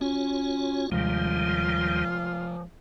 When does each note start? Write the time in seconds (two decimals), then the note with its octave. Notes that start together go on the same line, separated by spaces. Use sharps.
0.01 C#4 F4 F#4 C#5
0.92 D#2 C3 D#3 F3 G3 G#3 F4